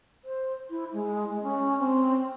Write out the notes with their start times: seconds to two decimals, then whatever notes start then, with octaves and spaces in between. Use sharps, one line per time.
0.25 C5
0.70 E4
0.93 G#3
1.30 G#3
1.43 C#4
1.79 C4